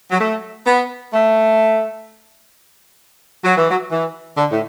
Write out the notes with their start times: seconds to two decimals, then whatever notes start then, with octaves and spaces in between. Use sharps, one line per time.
0.11 F#3
0.19 A3
0.65 B3
1.12 A3
3.43 F#3
3.56 E3
3.69 F#3
3.89 E3
4.36 D3
4.50 A2